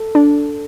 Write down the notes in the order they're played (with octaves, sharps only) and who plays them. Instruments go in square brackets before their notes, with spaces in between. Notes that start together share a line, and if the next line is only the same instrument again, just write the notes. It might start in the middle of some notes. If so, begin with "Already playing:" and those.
Already playing: [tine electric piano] A4
[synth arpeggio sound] D4